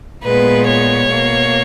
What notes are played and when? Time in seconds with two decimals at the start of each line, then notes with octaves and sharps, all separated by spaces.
0.23 A#2 G#3 B3 B4
0.66 C#5
1.08 B2 A#3